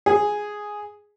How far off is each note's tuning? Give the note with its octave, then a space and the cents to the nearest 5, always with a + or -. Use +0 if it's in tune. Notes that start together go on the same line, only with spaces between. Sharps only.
G#4 +0